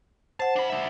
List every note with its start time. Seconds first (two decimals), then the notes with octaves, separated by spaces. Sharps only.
0.40 C5 F#5 A5
0.56 D4 B5
0.70 D4 E5